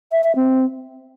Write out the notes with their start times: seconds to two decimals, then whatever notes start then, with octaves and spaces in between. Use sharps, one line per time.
0.12 E5
0.24 E5
0.36 C4